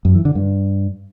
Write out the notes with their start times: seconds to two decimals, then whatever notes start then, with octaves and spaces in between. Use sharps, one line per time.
0.05 F#2
0.15 E3
0.25 D3
0.35 G2